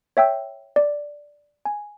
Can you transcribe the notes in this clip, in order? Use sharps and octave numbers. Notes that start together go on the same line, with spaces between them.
C#5 E5 G5 E6
D5
G#5